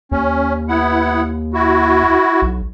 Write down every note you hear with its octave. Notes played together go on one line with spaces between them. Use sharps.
D#2 C#4
B3 E4 F#5
E4 F#4
B1